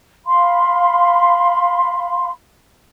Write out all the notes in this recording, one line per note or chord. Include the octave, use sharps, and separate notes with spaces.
F5 B5 C6